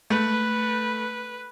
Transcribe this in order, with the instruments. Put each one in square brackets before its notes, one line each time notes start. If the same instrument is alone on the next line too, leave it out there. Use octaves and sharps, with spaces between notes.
[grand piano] A3 [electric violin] B4